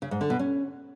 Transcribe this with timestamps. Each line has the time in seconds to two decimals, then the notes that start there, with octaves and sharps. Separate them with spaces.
0.02 C#3
0.11 G#2
0.21 D3
0.30 B2
0.39 C#4